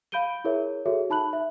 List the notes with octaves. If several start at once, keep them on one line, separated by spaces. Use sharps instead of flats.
F5 B5 G6 D7 D#7 G7
E4 G#4 A#4 C#5 E5
F#4 G#4 A4 C#5 E5
D#4 A5 B5 F#6 F#7
E5